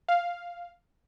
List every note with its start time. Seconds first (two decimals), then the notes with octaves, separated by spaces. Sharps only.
0.08 F5